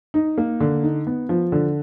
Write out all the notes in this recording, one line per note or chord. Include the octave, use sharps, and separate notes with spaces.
D#4
A#3
D3
D#4
B3
F3
D3